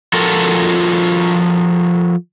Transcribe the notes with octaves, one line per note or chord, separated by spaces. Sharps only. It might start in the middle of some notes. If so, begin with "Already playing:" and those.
F3 F4 F#4 A4 A#4